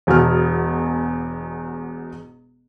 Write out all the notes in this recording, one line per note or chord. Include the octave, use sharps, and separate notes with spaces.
E1 E2 B2 F#4 A5 F6